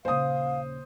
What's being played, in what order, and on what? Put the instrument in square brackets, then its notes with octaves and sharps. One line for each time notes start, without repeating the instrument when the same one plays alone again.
[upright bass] D#1 C#3 [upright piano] C5 D#6 [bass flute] F5